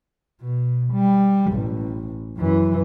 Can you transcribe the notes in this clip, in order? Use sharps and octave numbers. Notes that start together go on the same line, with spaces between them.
B2
G3
A1
F#2 E3